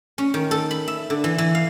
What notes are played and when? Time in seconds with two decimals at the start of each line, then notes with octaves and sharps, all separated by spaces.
0.18 C#4
0.34 D#3
0.51 A4
0.71 B5
0.88 E5
1.10 D3
1.24 E3
1.38 E3
1.55 F5